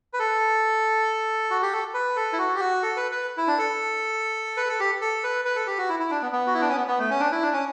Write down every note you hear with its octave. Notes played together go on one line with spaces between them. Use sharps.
B4
A4
F#4
G4
A4
B4
A4
E4
F#4
G4
F#4
A4
B4
B4
E4
D4
A4
B4
A4
G4
A4
B4
B4
A4
G4
F#4
E4
E4
D4
B3
B3
F#4
E4
D4
C#4
B3
B3
A3
C#4
D4
E4
D4
C#4